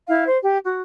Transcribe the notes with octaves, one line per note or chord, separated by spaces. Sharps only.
E4 F5
C5
G4
F#4